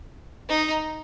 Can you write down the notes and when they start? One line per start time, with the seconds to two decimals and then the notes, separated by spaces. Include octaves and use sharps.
0.49 D#4